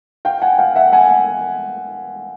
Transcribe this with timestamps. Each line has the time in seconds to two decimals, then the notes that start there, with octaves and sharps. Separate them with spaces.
0.25 F5 G5
0.42 F#5 G#5
0.58 F5 G5
0.76 E5 F#5
0.93 F#5 G#5